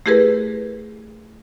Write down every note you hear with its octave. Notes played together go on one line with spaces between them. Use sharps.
A3 E4 G4 G#4 A#4 B4